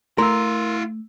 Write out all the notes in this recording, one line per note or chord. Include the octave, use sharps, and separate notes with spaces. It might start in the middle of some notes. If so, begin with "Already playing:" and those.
A3 E4 A#4 F5 C6 E6